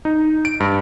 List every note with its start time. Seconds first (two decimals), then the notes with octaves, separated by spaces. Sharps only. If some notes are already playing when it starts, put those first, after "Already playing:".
0.05 D#4
0.45 D7
0.60 G2